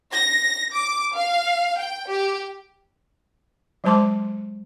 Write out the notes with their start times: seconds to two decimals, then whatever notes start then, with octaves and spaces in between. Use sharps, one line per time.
0.13 A#6
0.73 D6
1.15 F5
1.77 G5
2.08 G4
3.84 F#3 G#3 C5 A5 C6 D6